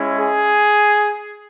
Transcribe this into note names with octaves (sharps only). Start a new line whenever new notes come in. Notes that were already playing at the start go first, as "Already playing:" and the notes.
Already playing: G#3 C#4 E4
G#4